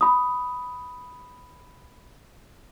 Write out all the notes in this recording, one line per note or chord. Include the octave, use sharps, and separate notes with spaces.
B5 D#6